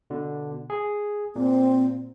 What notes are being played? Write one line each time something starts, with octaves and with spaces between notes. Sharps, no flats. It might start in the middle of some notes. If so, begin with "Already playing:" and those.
B2 D3
G#4
A#2 C4